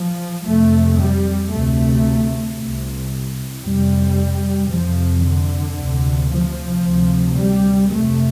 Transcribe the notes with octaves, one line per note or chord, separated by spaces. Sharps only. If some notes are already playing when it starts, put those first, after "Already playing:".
Already playing: F3
F2 C3 A3
G3
D2 C3 A3
C2 C3
F2 C3 G3
F2 C3 F3
D3
D2 C3
F3
D2 C3
G3
F2 C3 A3